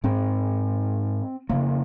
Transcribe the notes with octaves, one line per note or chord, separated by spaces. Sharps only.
G#2 C4
F2 C#3 A#3